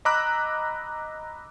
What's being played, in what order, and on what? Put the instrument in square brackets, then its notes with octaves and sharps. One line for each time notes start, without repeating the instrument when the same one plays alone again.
[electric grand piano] D#5 A#5 B5 D6 E6 F#6